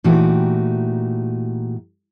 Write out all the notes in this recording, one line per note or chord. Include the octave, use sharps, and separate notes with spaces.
A#2 E3 A3 D#4 F#4 G4